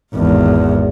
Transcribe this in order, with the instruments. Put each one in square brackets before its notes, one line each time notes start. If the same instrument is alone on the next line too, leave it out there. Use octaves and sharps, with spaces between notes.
[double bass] G#1 E2